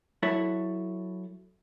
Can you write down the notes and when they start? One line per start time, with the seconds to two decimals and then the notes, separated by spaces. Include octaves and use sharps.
0.23 F#3 E4 A4 C#5